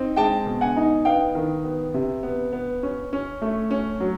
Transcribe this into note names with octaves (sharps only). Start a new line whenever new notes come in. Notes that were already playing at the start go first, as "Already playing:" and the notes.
Already playing: C4 D#4
G#3 G5 A5
B2
F#5 G#5
D#4
B3 F5 G5
D#3
B3
C3
B3
B3
C#4
C#4
A3
C#4
F#3